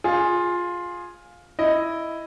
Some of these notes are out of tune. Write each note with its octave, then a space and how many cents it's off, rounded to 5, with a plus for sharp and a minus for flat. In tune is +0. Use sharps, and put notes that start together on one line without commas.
F4 +10 G#4 +0
E4 +0 D#5 +0